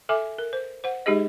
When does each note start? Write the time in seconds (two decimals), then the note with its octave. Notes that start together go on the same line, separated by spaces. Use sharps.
0.09 A4 E5 G#5 D6
0.38 A#4
0.53 C5
0.84 C5 F#5
1.06 G#3 D#4 G4 G#4 D#5